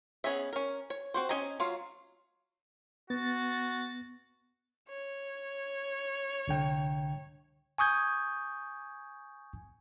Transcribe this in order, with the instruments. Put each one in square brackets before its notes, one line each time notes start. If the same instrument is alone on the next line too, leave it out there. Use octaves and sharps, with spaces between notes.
[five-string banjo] B3 C#4 G#4 D#5 E5
C#4 A#4
C#5
C4 F#4 C5
C#4 A4 D#5 G#5 A#5
F#3 F4 F5
[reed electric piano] B3 [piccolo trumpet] F#4 [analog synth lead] A6
[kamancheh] C#5
[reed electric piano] C2 D3 G5
[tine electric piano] G#5 C#6 D#6 G6 G#6